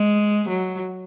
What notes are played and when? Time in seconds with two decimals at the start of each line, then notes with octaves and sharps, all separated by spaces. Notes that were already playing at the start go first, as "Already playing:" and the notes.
Already playing: G#3
0.49 F#3